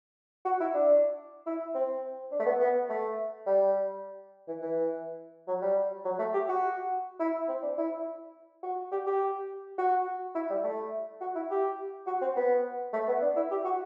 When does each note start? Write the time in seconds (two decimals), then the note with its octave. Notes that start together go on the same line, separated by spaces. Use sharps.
0.45 F#4
0.60 E4
0.74 D4
1.46 E4
1.75 C4
2.32 D4
2.40 A3
2.46 B3
2.60 B3
2.89 A3
3.46 G3
4.48 E3
4.62 E3
5.48 F#3
5.62 G3
6.05 F#3
6.19 A3
6.34 G4
6.49 F#4
7.20 E4
7.48 C4
7.62 D4
7.78 E4
8.63 F#4
8.92 G4
9.07 G4
9.78 F#4
10.35 E4
10.50 G3
10.64 A3
11.21 F#4
11.36 E4
11.51 G4
12.07 F#4
12.21 C4
12.36 B3
12.93 A3
13.08 B3
13.22 D4
13.36 E4
13.51 G4
13.65 F#4